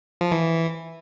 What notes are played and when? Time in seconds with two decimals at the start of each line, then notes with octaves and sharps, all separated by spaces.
0.21 F3
0.31 E3